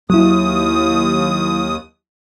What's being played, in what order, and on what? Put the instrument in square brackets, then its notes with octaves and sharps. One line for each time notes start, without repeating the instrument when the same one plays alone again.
[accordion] D#2 D#6 [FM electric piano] F#3 E4